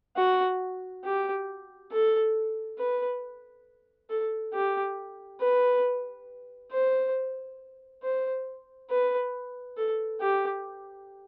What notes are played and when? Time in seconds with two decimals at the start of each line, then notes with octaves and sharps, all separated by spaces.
0.17 F#4
1.04 G4
1.92 A4
2.79 B4
4.10 A4
4.54 G4
5.41 B4
6.72 C5
8.03 C5
8.91 B4
9.77 A4
10.21 G4